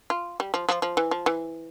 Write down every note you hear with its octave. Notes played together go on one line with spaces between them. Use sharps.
F4
G3
F3
F3
F3
E3
F3
E3